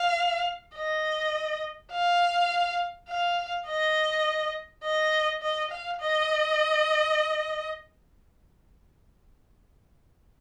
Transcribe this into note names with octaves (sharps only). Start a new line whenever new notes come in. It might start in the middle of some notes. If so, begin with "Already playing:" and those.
Already playing: F5
D#5
F5
F5
D#5
D#5
D#5
F5
D#5